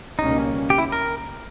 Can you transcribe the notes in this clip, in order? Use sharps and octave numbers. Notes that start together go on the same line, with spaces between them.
C#2 B2 G3 A#3 C#4 D#4
G4
E4
A#4